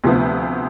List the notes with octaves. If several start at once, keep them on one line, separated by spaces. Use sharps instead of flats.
D2 C3 F3 B3